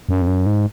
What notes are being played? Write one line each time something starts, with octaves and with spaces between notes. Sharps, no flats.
F#2
F2
F#2
G#2